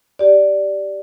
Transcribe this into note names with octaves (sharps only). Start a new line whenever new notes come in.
G4 D5